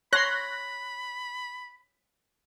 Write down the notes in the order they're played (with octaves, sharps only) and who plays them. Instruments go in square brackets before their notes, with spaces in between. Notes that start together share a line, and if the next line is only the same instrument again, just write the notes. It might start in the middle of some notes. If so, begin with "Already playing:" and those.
[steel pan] C#5 C6 [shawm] B5 [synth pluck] F#6 A#6